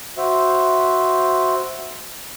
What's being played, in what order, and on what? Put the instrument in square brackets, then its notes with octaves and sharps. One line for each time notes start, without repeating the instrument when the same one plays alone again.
[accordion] F#4 C5 E5